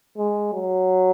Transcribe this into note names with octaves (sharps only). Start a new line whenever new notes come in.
G#3
F#3